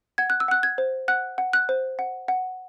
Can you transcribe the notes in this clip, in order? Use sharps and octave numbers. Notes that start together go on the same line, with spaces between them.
F#5 G#6
F#6
E6
F#5 F#6
G#6
C5
F#5 F#6
F#5
F#6
C5
F#5
F#5